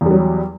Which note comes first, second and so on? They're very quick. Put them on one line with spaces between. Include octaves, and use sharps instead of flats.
E2 G3 F#3